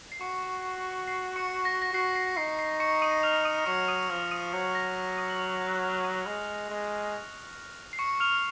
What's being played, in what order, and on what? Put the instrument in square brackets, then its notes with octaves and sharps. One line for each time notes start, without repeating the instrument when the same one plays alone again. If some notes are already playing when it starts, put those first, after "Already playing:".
[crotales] C7
[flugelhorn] F#4 [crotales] C#6 C#7
[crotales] C7
C#6 C#7
A#6
A#6
[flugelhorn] F#4 [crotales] C7
[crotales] C7
[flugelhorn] D#4 [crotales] C7
[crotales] C7
C#6 C#7
D#6 D#7
F6 F7
D#6 D#7
[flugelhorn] F#3 [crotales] C#6 C#7
[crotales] D#6 D#7
[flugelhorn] F3 [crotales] F6 F7
[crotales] D#6 D#7
[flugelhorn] F#3 [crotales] C#6 C#7
[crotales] A#6
D#6 D#7
F#7
F6 F7
F#6 F#7
F6 F7
D#6 D#7
[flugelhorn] G#3
G#3
[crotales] C7
C#6 C#7
F6 F7